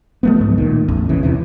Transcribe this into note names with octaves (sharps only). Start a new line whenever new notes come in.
F3 A3 B3
C#2 G#2
A#2 D#3
A1 E2
C#3 E3
E2 C3 E3